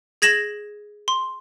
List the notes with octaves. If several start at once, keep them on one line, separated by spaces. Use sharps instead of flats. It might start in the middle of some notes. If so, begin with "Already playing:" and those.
G#4 G#6 A#6 E7 F#7
C6